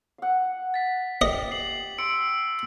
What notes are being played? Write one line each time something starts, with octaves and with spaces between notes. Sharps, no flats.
F5 F#5
A6 B6
G4 D#5
C7 F#7
C6 E6 C#7 D7